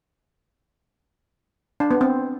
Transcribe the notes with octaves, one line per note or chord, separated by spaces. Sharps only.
D4
B3
C4